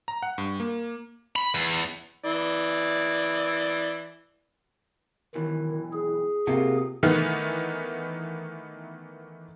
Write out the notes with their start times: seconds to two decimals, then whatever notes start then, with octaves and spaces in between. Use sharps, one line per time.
0.08 A#5
0.23 F#5
0.38 G2
0.60 A#3
1.36 B5
1.54 E2
2.24 E3 D5
5.35 B1 D#3 E3
5.93 G#4
6.47 C3 A#3 F4 F#4
7.03 D#3 E3 A3 B3